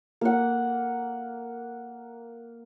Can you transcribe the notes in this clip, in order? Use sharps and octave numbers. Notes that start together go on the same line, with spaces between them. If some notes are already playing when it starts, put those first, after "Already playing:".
A#3 F#5